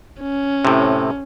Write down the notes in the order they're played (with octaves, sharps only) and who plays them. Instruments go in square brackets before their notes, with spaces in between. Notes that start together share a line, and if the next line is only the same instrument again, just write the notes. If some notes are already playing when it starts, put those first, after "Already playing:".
[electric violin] C#4
[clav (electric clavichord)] A2 C3